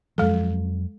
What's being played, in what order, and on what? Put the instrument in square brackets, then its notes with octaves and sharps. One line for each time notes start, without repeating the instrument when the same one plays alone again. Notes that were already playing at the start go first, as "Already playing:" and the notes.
[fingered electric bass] F2 F3 F#3 [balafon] G#3 A4